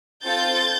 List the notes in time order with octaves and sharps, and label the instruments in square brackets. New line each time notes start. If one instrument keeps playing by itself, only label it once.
[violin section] C4 F4 A4 G6 A6